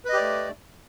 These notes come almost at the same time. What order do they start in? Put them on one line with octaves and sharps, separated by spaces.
B4 D#5 G4 D5 A3